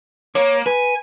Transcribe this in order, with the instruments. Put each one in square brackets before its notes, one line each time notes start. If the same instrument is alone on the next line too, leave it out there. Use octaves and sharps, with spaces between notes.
[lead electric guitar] A#3 [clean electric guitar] C#5
[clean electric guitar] B4 [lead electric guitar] G#5